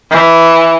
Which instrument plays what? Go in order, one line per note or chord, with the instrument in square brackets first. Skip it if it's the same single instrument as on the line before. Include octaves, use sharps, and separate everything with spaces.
[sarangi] E3